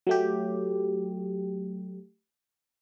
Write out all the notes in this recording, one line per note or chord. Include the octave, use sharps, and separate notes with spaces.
F#3 A3 G4